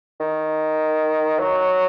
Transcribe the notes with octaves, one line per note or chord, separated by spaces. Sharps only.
D#3
F#3